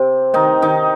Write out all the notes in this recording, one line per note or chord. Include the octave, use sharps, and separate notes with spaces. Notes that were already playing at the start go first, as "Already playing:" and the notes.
Already playing: C3 C4
D#3 D#4
D#3 D#4